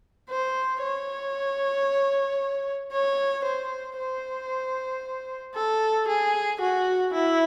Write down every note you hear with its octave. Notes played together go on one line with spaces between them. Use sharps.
C5
C#5
C#5
C5
C5
A4
G#4
F#4
E4